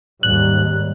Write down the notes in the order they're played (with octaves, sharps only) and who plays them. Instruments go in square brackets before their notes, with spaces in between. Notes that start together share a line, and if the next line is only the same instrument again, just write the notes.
[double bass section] D#2 G#2 G3 [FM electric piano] F#6